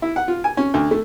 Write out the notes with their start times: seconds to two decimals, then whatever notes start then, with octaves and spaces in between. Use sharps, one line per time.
0.02 E4
0.16 F#5
0.28 F4
0.44 G#5
0.57 C#4
0.74 D2
0.91 A3